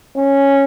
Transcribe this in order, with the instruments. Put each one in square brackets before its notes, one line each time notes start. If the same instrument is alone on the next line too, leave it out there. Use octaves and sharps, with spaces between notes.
[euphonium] C#4